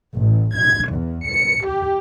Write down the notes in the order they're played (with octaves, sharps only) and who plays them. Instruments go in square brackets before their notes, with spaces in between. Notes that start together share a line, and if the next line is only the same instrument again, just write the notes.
[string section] A1
G#6
E2
C#7
G4